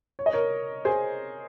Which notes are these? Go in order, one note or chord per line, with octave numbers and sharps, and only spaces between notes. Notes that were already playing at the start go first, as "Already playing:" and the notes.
C#5
D#5
A#4 C#5
G#4 C5